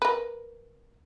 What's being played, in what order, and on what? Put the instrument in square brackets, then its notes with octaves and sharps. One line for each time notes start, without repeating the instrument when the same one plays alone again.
[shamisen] A#4 B4